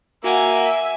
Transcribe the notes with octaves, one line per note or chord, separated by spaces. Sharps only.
A#3 F#4 E5 F#5 G#5